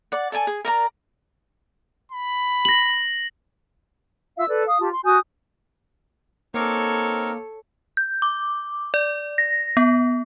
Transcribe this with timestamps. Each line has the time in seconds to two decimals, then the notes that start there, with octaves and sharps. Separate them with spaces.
0.12 D5 F#5
0.32 A4 D5 G#5 A5
0.47 G#4
0.65 A#4 D5 A#5
2.12 B5
2.65 A#6 F#7
4.37 F4 E5 F5 E6
4.49 A4 B4 D5
4.66 F5 D#6
4.80 F4 G4 A5
4.92 C6
5.05 F#4 G#5 D#6 G6
6.54 A#3 C4 D#4 A4 A#4 C#5 F5 D6
7.97 G6
8.22 D6
8.94 D5
9.38 A#6
9.77 B3